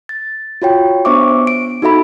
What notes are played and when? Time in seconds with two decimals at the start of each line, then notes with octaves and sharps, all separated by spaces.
0.09 A6
0.62 F4 F#4 C#5 G5
1.05 B3 D4 C5 E5 C#6 D6
1.47 D7
1.82 D#4 F#4 A4 E5 B5